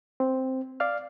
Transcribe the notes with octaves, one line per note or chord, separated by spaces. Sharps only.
C4
D5 F5 F6